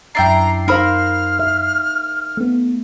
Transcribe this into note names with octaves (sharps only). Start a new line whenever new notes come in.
F#2 D4 E4 G5 A#5 C7
D#4 A#4 C5 F5 B5 E6 F6
E5
A3 B3